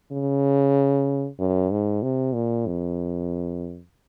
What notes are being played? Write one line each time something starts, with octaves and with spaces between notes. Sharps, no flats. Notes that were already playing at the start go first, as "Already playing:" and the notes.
C#3
F#2
G#2
C3
A#2
F2